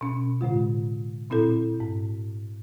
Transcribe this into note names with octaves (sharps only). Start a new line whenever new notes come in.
B2 C#4
A2 D3 G#3 F4
A#2 C4 E4 A4
G#2